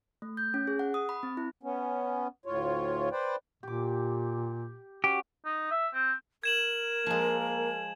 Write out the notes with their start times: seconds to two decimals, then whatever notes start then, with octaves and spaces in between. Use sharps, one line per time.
0.22 A3
0.37 G6
0.54 C#4
0.67 G#4
0.79 F#5
0.94 D#6
1.09 B5
1.23 C4
1.37 E4
1.63 B3 C#4
2.46 D2 A2 F4 C#5
3.12 B4 C5 D5 G5
3.63 A#2 G4 D6
5.04 C#4 F#4 G4
5.45 D#4
5.71 E5
5.93 C4
6.44 A#4 G#6 E7 F#7
7.06 F3 G#3 A#3